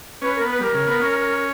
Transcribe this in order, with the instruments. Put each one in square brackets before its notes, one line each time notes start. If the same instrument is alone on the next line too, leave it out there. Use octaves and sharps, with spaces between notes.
[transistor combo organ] C#4 [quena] B4
[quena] A#4
[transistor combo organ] B3
[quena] B4
[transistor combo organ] G3 [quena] A#4
[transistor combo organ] C#3
B3
C#4